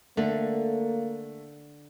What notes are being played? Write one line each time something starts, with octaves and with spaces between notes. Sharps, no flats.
D3 A3 A#3